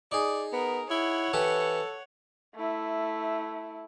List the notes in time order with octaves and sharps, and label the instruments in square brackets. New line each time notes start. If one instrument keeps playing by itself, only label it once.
[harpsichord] D#4 G#4 [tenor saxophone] D5
[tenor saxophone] B3 [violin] A#4
[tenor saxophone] E4 [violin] C#5 F#5
[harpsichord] E3 G4 B4 [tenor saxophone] A4
[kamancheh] A3 E4